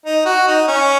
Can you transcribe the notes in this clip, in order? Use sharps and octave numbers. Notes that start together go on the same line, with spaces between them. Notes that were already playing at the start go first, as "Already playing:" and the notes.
D#4
F#4
D#4
C#4